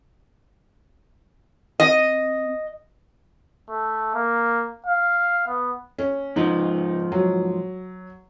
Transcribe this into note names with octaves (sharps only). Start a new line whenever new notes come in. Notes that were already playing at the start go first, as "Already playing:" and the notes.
C4 D#5
A3
A#3
F5
B3
C#4
G#2 F3 D#4
F#3